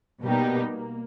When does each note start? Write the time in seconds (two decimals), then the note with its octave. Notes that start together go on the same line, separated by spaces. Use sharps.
0.24 B2 G3 A#3 B3 D#4 G4
0.71 A#3